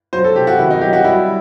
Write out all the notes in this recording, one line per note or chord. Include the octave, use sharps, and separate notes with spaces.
F#3 C5
A4
C3 G4
F#4
D#3 E4
D#4
F#3 G4
F#4
G3 E4